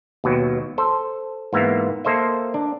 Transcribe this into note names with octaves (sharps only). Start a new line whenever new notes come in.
D#2 B2 F#3
A4 C5
G#2 E3 A#3 B3 E5 F5
A#3 A4 C5 D#5 E5
D4